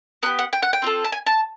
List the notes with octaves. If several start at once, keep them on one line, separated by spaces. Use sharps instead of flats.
B3 D4 G4 F#5
F#5
G5
F#5
G5
C4 F4 A4
A5
G#5
A5